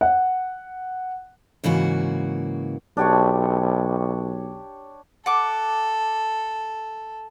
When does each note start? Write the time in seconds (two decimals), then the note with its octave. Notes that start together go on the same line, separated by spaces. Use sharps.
0.01 F#5
1.64 G#2 C#3 E3 A#3 F#4
2.97 B1 D4 G4 C#5
5.26 A4 F#5 D6